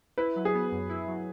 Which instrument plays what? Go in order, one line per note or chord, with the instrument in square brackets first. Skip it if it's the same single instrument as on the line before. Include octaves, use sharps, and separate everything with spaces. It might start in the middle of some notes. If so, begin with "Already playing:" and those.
[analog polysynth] E4 [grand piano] B4
[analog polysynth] F#3
[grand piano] G#4
[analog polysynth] B3
F#2
E4
F#3